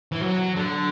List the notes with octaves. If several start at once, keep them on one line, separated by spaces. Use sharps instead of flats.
E3
F#3
D3